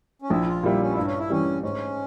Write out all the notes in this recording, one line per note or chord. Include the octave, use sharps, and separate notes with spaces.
C#4
A#1 E4
F4
A#2 G3 E4
C#4
G2 E4
C#4
E4
E3 G3 C#4
G#2 C#4